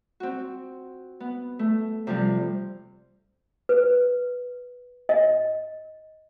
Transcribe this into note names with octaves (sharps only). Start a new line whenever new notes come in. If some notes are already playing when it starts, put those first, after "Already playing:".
C4 F#4
B3
A3
C3 F3 G3
B4
D#5